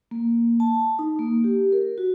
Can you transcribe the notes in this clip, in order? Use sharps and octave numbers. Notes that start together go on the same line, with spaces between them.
A#3
A5
D#4
A#3
G4
A#4
F#4